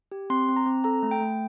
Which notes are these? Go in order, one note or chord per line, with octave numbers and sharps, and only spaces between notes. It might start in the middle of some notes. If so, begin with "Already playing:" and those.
G4
C4 C6
C4
A#5
C4
A4 A#5
A3
G5
A3